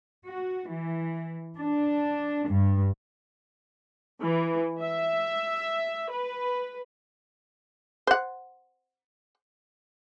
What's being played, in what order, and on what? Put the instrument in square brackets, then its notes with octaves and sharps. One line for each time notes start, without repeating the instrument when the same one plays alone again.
[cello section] F#4
E3
D4
G2
[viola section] E3
E5
B4
[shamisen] C5 F#5